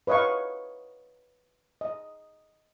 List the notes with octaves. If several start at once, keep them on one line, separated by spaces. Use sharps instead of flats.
B4 C#5 D#5 F5 C#6
D#5